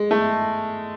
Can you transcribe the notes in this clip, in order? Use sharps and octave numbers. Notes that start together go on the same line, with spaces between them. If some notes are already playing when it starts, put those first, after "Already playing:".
Already playing: G#3
A3